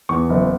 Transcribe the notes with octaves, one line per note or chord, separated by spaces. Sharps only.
E2 C#6
F#1